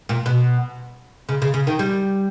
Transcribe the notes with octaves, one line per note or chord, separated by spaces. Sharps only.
A#2
B2
C#3
C#3
C#3
D#3
G3